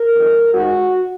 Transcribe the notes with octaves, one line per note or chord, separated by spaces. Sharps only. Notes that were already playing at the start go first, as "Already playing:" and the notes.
Already playing: A#4
F2 D#3 G#3
G#2 D#3 G#3 F#4